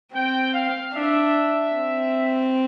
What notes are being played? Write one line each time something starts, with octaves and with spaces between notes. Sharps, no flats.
C4 G5
F5
D4 E5
C4